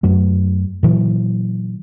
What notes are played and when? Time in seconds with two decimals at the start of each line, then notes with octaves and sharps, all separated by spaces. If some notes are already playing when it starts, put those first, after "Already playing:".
0.03 F#2 F#3 A3
0.83 A#2 E3 F#3